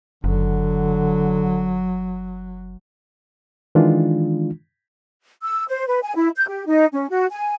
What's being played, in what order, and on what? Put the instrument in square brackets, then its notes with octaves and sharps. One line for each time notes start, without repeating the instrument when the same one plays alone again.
[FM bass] F#1 [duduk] D3 [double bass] F#3
[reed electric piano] D#3 E3 G#3 D4 F4
[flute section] E6
C5
B4
G#5
E4
G6
G4
D#4
C#4
F#4
G#5